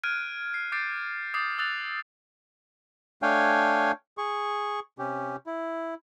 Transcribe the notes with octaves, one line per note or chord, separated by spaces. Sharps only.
F6 F#6 G#6 D7 D#7
C7
D6 G6 A6 C7 D7
D6 D#6 G6 A6 C7
D#6 E6 F#6 A6 F7
A3 D4 C#5 F5 G5 G#5
G#4 C#6
C3 C#4 G4
E4